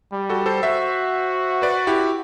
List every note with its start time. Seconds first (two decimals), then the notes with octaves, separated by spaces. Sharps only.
0.12 G3
0.29 F#4 A4
0.46 A4 C5
0.63 F#4 C5 E5
1.62 B4 D5
1.87 E4 G4